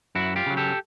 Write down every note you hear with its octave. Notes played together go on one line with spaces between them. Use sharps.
F#2 E4 F#4
F4 G4
C#3 F#3
G4 A4